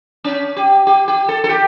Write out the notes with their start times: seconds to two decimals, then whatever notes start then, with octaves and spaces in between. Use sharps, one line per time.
0.24 C#4
0.57 G4
0.87 G4
1.08 G4
1.29 A4
1.44 A4
1.49 G4